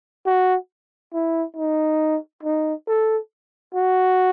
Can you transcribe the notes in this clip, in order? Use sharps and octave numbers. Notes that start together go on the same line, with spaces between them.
F#4
E4
D#4
D#4
A4
F#4